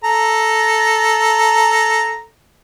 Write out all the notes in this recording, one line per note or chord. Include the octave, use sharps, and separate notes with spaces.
A4 A#5